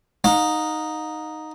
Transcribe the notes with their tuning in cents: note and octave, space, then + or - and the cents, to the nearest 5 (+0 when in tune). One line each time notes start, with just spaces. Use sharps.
D#4 -5 F5 +45